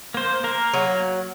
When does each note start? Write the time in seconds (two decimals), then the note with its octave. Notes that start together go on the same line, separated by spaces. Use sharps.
0.14 A#3 C5
0.44 A#3 A#4
0.73 F#3